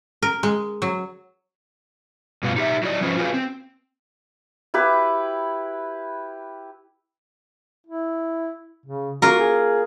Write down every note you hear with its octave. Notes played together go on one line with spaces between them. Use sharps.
A#4
G#3
F#3
G2 B2 B3 F4
D#4 G4 E5
F#3 E4 D5 D#5
F3 A3 C#4 F4 B4 C5
F4 F#4 G#4 A4 B4 F5
C4
E4 G4 B4
E4
C#3
A#3 F4 F#4 A#4
G#4